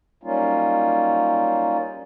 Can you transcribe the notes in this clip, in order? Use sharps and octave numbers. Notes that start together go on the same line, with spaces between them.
F#3 G3 A#3 C#4 D#4 F4